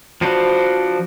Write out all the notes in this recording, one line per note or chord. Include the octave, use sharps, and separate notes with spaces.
F3 D4 F#4 B4 C5